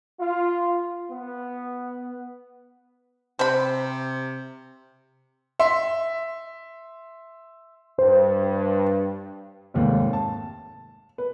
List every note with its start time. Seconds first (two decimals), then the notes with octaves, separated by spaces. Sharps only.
0.19 F4
1.11 B3
3.39 C3 C5 B5
5.59 E5 C6
7.99 G2 C5
9.74 F1 D#2 G#2
10.13 A5
11.18 B4